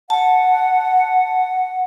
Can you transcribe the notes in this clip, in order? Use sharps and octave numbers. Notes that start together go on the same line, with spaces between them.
F#5 A5